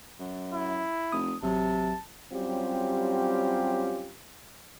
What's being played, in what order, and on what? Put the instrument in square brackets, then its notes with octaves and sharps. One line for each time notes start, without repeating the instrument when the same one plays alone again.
[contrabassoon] F#2
[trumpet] E4
[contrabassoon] F1 [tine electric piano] D#6
[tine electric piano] A1 F#3 [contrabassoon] C3 [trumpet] A5
[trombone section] F#3 G3 C4 C#4 F4 G4